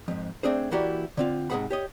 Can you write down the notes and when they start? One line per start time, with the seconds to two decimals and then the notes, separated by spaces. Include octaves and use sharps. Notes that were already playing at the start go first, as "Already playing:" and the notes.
0.08 F2 G#2
0.43 A3 A#3 C4 D4 G#4 C5
0.71 E3 A#3 E4 F#4 G4 D5
1.17 D3 C4 F4
1.50 G#2 C3 B3 G#4 F#5 B5
1.71 G4 C#5 D#5